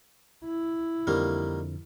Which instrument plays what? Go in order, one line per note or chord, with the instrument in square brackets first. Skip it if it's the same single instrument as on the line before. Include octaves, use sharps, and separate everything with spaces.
[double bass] E4
[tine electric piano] F2 D3 F3 [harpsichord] D#3 G3 A#3